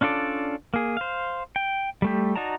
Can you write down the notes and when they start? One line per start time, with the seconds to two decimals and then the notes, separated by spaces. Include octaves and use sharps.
0.01 C#4 D4 F4 A4 D5
0.74 A#3 G#4
0.97 C5 F5
1.56 G5
2.02 G3 A3 G4
2.36 D#4 F#4 D5 A5 A#5